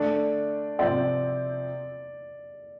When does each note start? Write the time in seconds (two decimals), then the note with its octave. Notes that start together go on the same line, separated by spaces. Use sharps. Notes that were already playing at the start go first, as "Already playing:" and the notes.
Already playing: D3 A3 D4 D5
0.79 C3 F3 C4 D5